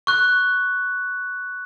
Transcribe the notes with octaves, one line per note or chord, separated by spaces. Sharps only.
C#6 F#6